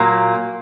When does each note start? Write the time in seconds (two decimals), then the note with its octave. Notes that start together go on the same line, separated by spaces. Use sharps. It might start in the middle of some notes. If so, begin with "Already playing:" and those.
Already playing: A#2 F#3 A#3